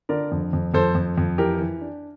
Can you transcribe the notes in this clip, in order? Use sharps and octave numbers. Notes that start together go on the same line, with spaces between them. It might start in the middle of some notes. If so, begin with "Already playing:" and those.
D3 A#4 D5
F2
F2
F2 A4 C5
F2
F2
E3 G4 A#4
E3
D4